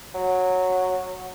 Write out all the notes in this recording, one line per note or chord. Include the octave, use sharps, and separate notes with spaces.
F#3